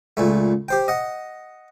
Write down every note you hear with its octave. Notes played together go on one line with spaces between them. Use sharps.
C#2 A#2 A3
G4 C5 G5
D#5 F#5